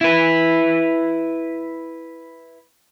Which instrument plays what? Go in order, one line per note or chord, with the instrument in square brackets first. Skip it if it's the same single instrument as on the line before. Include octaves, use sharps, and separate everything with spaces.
[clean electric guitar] E4 B4